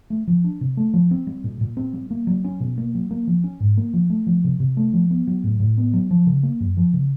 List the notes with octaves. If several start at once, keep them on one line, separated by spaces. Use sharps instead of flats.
A3
F3
D4
C3
A3
F3
C4
G3
A#2
A#2
C4
G3
A#3
F#3
C#4
B2
A#3
F#3
A#3
F3
C#4
G#2
A#3
F3
A3
F3
C3
C3
A3
F3
B3
F#3
A2
A2
B3
F#3
F3
C#3
A#3
F#2
F3
C#3